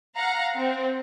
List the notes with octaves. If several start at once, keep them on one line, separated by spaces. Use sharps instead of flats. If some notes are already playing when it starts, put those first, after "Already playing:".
F5 F#5 A#5
C4